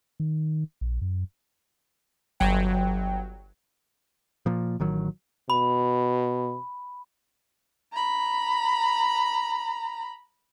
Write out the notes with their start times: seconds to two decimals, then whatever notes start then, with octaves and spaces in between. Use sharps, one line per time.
0.20 D#3
0.81 A#1
1.02 F#2
2.40 G1 F#3 G5
4.46 A#2 F3
4.80 A1 D#3 F#3
5.50 B2 B5
7.93 A#5 B5